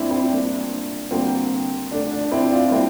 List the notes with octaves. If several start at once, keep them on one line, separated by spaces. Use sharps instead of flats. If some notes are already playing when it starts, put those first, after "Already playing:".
Already playing: E3 G3 A#3 C4 D4 E4
C4 E4
A#2 G3 A#3 D4
D3 G3 A#3 C4
D3 A3 D4
D4
C4 E4
D4 F4
A#2 G3 A#3 C4 E4